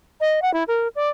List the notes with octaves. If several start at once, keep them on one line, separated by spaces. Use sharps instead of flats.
D#5
F#5
E4
A#4
D5